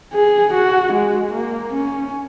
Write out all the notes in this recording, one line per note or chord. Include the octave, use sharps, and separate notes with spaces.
G#4
F#4
G#3
A#3
C#4